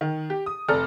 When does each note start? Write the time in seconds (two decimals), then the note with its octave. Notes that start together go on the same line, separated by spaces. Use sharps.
0.01 D#3
0.30 G4
0.46 D#6
0.68 F1 A4 D5 A#5 F6